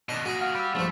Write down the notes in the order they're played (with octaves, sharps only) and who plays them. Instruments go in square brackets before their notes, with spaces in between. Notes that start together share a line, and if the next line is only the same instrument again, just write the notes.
[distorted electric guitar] B2 D#3 [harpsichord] D4 D#5
[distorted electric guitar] A#2 G#4 [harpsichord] F#4 A#5
[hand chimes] F5 F#5 F6
[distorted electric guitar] G4 D5 [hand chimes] B5 E6
[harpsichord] A#1 G2 F3 [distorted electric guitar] A3